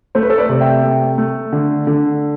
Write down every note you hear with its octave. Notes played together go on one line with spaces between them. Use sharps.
A3 C5
B4
A4 C5
B4 D5
C3
E5 G5
A3
A3
D3
D3